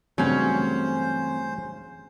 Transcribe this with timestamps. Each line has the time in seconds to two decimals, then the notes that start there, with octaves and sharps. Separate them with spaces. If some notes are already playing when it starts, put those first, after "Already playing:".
0.18 G2 C#3 E3 F#3 A3 C4 C#4 C5